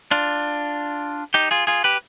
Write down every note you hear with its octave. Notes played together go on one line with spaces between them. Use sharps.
D4 F4
D#4 G4
F4 G#4
F4 G#4
G4 B4